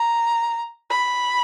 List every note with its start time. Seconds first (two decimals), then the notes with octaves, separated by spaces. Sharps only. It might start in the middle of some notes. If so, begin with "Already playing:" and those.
Already playing: A#5
0.90 B5